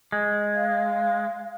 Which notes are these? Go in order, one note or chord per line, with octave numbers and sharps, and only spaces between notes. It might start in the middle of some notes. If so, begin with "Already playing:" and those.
G#3
F5